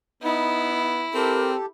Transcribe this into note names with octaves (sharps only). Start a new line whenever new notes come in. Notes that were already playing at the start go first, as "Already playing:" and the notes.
B3 D#4 E4
C4 G4 A4 A#4